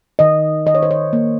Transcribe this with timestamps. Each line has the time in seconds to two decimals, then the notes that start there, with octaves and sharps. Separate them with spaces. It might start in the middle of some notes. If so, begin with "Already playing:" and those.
0.19 D#3 D#5
0.66 D#3 D#5
0.75 C#5
0.83 C5
0.91 C#5
1.13 A#3